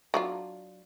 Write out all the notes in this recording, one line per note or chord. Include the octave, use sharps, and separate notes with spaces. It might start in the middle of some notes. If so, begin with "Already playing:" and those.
F#3 D4 F4